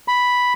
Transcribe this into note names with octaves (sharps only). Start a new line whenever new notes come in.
B5